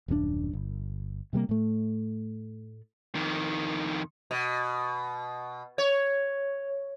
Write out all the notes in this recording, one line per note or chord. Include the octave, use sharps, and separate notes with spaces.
D#1 F#2 G#3 D4
G1
C3 G3 G#3 A#3
A2 A3
F2 D#3
B2
C#5